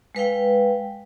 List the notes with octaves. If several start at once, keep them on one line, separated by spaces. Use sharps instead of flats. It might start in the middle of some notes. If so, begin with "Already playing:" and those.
G#3 B4 F5 G5